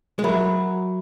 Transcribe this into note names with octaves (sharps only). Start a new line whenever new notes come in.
G#3
F#3 A#4 E5 B5